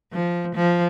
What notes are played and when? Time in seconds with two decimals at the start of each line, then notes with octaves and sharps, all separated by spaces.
0.13 F3
0.55 F3